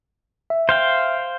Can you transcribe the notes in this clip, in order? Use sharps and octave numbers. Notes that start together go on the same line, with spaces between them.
E5
C5 F5 G5